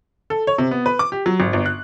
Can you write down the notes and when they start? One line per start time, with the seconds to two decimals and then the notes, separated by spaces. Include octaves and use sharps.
0.30 A4
0.47 C#5
0.58 C3
0.71 B3
0.86 B4
0.99 D6
1.12 G4
1.26 F#3
1.40 G#1
1.53 G1
1.66 F#6